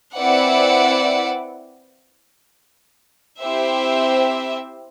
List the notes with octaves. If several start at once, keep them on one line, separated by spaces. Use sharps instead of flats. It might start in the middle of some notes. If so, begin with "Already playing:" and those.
C4 E4 B4 D5 F#5
C4 E4 G4 C5 E5